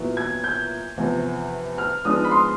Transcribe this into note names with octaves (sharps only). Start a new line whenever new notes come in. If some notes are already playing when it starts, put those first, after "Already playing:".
Already playing: A#2 F#3 B3 E4
G#6
G6
E2 C3 F3
F6
G#2 F3 G#3 B3 D4 D#6
B5
C6